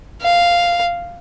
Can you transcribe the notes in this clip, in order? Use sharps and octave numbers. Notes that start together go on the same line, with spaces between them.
F5